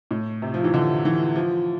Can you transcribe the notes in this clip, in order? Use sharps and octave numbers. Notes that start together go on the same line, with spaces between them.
A2
C3
F3
E3
D3
E3
F3